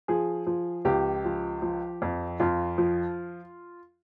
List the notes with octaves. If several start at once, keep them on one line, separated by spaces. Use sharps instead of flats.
F3 G#4
F3
C#2 G4
F3
F3
F2
F2 F4
F3